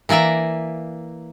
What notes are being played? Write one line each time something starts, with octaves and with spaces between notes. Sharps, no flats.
E3 A#3 D5 E5 A#5